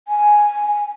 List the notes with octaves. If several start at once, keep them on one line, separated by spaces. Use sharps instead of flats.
G#5